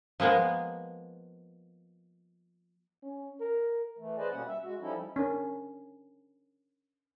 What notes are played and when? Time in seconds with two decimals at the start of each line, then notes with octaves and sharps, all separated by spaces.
0.20 F3 G#3 A#3 B3
3.02 C#4
3.40 A#4
3.98 E3 A3
4.17 G#4 B4 C5 D5 D#5
4.31 B2 G3 A#3 C#4 F#5
4.47 E5
4.63 G#3 F#4
4.80 F3 G3 C#4 D#4 E4 A4
5.16 C#4 D4 A#4